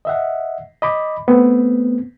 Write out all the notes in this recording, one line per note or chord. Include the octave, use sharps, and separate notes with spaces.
D#5 E5 F#5
D#5 B5 D6
A3 B3 C4